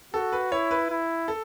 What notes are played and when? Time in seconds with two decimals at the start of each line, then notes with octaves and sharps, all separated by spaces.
0.14 F#4 A4
0.32 B4
0.52 E4 C#5
0.71 B4
0.90 E4
1.28 A4